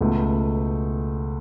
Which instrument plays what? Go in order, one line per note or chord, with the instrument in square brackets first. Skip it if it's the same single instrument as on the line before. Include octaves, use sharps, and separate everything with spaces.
[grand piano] C#2 B2 A3